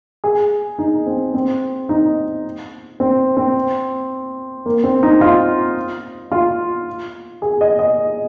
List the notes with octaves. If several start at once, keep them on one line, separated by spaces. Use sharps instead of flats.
G#4
D#4
C4
C4
D#4
C4
C4
A#3
C4
D#4
F4
F4
G#4
D#5
D#5